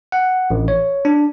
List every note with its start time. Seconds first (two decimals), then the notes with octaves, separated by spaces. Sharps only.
0.12 F#5
0.50 A1
0.68 C#5
1.05 D4